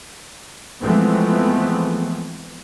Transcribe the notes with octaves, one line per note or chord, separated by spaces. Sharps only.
E3 F3 G#3 A3 B3 C4